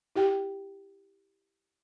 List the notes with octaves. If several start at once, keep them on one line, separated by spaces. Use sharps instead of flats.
E4 G4 G5